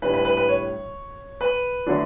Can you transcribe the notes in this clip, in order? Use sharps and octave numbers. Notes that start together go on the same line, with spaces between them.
A2 G3 D4 B4
B4
B4
B4
C#5
B4
D3 F#3 A3 D4